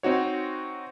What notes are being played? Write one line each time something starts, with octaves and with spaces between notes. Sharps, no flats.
C4 D#4 F#4 C#5